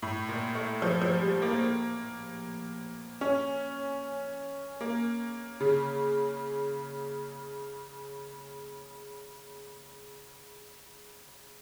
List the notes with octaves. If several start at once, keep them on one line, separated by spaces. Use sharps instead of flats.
A2
A#2
A3
F3
F3
G3
A#3
C#4
A#3
C#3